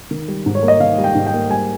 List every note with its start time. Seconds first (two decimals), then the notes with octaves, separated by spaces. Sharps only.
0.11 D#3
0.28 G3
0.46 G#2
0.55 C#5
0.62 A#3
0.68 D#5
0.80 D#3 F5
0.98 G3
1.04 G5
1.15 G#2
1.27 G5
1.33 A#3
1.50 G3 G#5